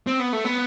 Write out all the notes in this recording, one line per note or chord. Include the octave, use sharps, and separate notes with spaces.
C4
B3
A3
B3